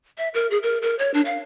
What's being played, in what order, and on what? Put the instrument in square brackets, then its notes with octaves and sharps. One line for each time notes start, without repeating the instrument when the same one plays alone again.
[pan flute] E5
A#4
G#4
A#4
A#4
C#5
D4
F5